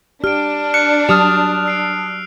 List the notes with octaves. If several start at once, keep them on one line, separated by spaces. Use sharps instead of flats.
D4 G4 F6 D7
F#6 C#7
F#3 G4 A5 D#6 F6 F7
E6 C7 D7